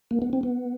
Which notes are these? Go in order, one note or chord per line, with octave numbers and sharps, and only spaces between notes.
A#3
B3
C4
B3